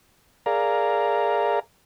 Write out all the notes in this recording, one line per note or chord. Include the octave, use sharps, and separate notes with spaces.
G#4 A#4 D5 F5 A#5